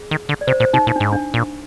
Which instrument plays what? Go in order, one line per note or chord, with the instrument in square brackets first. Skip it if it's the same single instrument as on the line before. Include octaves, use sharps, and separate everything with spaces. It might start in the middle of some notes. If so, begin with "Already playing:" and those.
Already playing: [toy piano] G#4
[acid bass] D#3
D3
[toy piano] D5
[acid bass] C3 [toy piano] C5
[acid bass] A#2 [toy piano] C5
[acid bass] C3 [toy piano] D#4
[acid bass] A#2 [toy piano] D#4
[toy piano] D4
[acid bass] G#2
[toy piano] D4
[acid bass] A#2